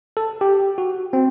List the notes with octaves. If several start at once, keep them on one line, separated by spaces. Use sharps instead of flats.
A4
G4
F#4
C4